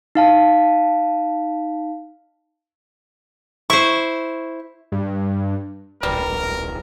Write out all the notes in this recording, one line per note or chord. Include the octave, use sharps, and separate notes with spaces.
D#4 F5 A5
E4 C5 C#6
G2
D1 A#1 G3 A#4 B4